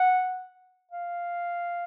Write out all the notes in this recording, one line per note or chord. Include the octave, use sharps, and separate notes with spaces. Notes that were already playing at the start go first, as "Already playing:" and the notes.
Already playing: F#5
F5